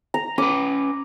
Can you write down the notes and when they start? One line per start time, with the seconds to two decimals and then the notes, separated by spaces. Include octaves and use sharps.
0.14 A#5
0.38 C#4 B4 D6